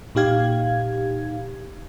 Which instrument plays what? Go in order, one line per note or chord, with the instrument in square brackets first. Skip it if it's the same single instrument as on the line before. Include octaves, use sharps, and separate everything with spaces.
[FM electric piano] A#2 D#4 G4 F5 G#6